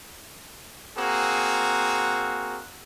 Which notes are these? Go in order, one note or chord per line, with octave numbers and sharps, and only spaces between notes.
A#3 C4 F#4 G#4